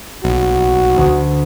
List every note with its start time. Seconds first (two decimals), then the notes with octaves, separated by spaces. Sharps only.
0.24 B1 F#4
0.97 D2